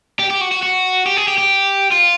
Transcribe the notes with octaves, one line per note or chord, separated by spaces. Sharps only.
G4
G4
F#4
F#4
F#4
G4
G#4
G4
G4
F4